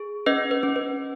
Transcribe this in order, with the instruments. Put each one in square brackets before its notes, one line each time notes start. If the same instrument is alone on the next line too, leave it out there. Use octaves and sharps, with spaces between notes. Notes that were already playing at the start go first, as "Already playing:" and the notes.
Already playing: [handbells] G#4
C#4 B4 D#5
B4
C#4
B4